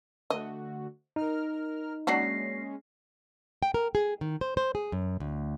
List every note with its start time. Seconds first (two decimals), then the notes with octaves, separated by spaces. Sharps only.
0.30 D3 A3 F#4 D#5
1.16 D#4 A#4 F6
2.07 F#3 G#3 A#3 C#4 D4 F#4 A#6 C7
3.63 G5
3.74 A#4
3.95 G#4
4.21 D#3
4.41 C5
4.57 C5
4.75 G#4
4.92 F#2
5.20 D2